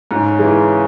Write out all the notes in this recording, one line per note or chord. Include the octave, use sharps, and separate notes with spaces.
G#2 C#3
E3 G#3